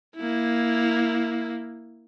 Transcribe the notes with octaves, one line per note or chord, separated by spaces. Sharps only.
A#3 E4